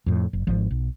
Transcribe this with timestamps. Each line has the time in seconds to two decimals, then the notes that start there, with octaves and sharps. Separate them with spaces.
0.06 F2 A2
0.33 F#1
0.47 G#1 F3
0.71 B1